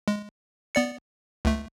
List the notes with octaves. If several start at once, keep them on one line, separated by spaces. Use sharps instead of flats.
G#3
B3 D5 C#7
C#2 A3